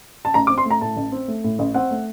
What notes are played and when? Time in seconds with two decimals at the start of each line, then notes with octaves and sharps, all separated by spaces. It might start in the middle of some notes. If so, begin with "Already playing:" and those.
0.25 A5
0.34 A1 A#5
0.47 D6
0.50 C4
0.58 C6
0.65 A3
0.70 A#5
0.81 A2 A5
0.97 A1
1.12 C4
1.28 A3
1.44 A2
1.59 A1
1.74 C4 F#5
1.91 A3